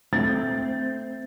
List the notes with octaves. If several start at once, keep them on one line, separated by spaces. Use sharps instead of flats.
A3 C4 A6